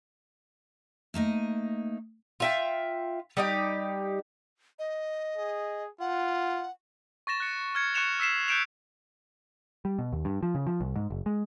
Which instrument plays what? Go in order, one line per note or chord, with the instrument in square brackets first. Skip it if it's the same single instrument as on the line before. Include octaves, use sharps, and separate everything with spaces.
[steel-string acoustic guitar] A3 A#3 D#4 D#5
[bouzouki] F4 E5 G5
G3 D#4 G4
[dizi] D#5
[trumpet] G#4
[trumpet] F4 [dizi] F#5
[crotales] C#6 A6 A#6 E7
F#6 C#7
F6 G#6 C#7
C#6 F#6 C#7 E7 F7
E6 B6 C7 E7
F#6 G6 C#7 D7 E7 F7
[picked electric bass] G3
B2
D#2
G2
F3
C#3
F3
C2
G#2
F#1
G#3